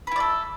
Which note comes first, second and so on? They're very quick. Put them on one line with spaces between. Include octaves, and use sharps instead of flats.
B4 E4 D5 A4